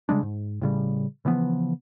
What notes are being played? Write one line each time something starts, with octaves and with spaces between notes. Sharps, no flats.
C#3 G3 G#3 D4
G#2
A2 C#3 G3
C#3 E3 F3 B3